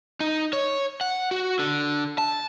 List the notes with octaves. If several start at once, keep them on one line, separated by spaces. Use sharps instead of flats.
D#4
C#5
F#5
F#4
D3
A5